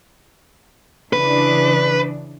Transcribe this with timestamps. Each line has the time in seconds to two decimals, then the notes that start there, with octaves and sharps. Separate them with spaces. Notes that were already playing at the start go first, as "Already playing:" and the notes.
1.13 C#3 E3 D4 B4